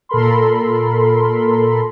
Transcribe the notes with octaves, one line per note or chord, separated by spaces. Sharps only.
A#2 A4 A#4 B5 C6